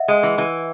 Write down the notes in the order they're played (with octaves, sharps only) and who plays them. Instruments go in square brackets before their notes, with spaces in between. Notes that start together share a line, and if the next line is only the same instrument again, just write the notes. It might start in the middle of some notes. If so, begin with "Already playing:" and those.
Already playing: [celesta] D#5 E5 F#5
[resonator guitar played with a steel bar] G#3
E3
E3